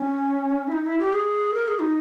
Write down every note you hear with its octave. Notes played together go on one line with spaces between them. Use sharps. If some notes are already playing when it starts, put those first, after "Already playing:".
Already playing: C#4
E4
D#4
E4
G4
G#4
A#4
G#4
D#4